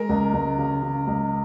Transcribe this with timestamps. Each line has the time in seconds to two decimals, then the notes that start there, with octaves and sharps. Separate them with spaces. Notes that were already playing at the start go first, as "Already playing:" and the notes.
Already playing: G#3 A#4 A#5
0.09 C#2
0.33 C#2
0.58 C#3
0.82 C#3
1.07 C#2